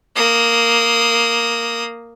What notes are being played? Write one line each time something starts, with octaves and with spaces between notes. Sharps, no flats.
A#3 D#6